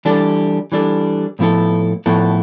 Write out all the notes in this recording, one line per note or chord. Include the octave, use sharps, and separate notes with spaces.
E3 G3 D4 A4
E3 G3 D4 A4
A2 F3 B3 E4 A4
A2 F3 B3 E4 A4